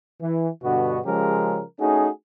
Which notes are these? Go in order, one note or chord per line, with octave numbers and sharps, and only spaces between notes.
E3
G2 B2 D3 B3 F#4
C#3 F3 G#3 C#4 G4 A#4
A3 C#4 D#4 F#4 G#4